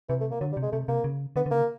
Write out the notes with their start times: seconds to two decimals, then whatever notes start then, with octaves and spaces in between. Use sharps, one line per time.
0.09 C3 E3
0.21 A3
0.31 A#3
0.40 D3 F#3
0.52 G3
0.57 C3
0.63 G#3
0.72 C3 A3
0.88 C3 A#3
1.04 C#3
1.36 D3 B3
1.46 D3
1.51 C#3 A#3